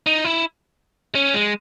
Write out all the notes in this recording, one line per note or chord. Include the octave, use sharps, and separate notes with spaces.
D#4
E4
C#4
G#3